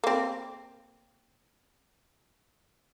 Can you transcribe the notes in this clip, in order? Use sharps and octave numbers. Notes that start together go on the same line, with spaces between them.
A#3 C4